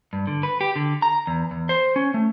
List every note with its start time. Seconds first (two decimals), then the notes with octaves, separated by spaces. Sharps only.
0.13 G2
0.27 D3
0.43 B4
0.61 G4
0.76 D3
1.02 A#5
1.27 E2
1.51 E2
1.69 C5
1.96 C#4
2.14 A3